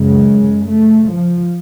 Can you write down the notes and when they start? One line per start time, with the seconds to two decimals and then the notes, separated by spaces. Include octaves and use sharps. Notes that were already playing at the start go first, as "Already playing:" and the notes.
Already playing: F#2 C#3 G#3
0.68 A3
1.06 F3